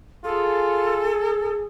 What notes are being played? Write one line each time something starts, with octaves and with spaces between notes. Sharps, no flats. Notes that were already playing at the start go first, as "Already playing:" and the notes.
F4 G#4 A4